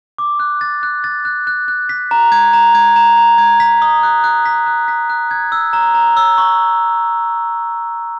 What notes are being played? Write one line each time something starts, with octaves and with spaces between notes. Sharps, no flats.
D6
F#6
A6
F#6
A6
F#6
F#6
F#6
B6
A#5
G#6
A#5
G#6
A#5
A#5
G#6
B6
D#6
F#6
F#6
B6
F#6
B6
F#6
G#6
E6
A#5
A#5
E6
C#6